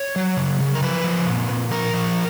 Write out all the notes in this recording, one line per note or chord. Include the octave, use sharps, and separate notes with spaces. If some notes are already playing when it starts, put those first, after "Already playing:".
Already playing: C#5
F#3
C#3
C#3
A#4
F3 B4
F3
A#2
A#2
F3 A#4
F3